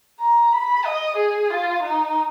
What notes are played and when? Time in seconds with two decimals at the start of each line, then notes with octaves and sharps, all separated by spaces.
0.20 A#5
0.53 B5
0.85 D#5
1.17 G#4
1.50 F4
1.82 D#4